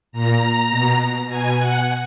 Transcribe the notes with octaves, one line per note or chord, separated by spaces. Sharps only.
A#2 A#5
B2
B2 G#5
F#5